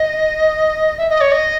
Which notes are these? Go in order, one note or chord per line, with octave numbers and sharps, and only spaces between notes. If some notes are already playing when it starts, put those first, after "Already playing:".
Already playing: D#5
E5
D#5
C#5
D#5